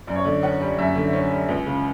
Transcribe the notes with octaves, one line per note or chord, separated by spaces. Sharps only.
F#2 D5
C#5
D3 D5
C#4 F#5
G3
F#2 E5
D3
C#4
G3
C#2
C#3